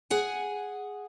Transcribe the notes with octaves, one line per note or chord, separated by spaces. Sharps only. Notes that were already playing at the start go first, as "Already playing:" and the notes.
G#4 F#5 G#5